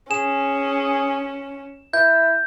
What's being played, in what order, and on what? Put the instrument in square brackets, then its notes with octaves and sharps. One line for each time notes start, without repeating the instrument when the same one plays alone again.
[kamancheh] C#4 [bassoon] G#4 [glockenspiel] E7
[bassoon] E4 [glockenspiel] G6